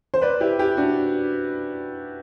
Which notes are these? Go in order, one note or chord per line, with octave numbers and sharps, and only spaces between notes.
C5
B4 D5
E4 G4
E4 G4
D4 F#4